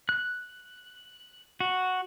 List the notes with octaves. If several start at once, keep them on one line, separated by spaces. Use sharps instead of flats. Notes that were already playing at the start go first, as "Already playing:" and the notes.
F#6
F#4